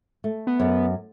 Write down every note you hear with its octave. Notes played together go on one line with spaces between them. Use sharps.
A3
B3
F#2